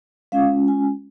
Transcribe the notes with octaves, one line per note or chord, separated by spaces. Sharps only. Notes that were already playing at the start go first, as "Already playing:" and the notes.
G#3 C#4 F4 F5
G#5